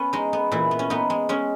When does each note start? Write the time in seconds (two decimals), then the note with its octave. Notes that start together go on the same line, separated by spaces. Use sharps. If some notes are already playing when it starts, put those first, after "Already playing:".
Already playing: B3 C#4
0.13 G#3 D#4
0.33 B3
0.51 A#2 E3 E4
0.71 B3
0.79 C#4
0.90 B3 D#4
1.10 G#3
1.29 G#3 C#4